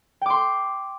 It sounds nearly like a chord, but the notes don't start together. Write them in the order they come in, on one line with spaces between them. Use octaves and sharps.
G5 D6 C6